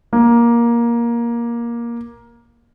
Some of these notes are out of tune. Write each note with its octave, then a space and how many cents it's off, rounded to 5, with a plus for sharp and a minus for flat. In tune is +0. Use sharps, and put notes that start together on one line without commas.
A#3 +15